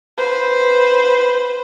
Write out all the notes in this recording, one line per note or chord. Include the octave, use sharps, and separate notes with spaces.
B4 C5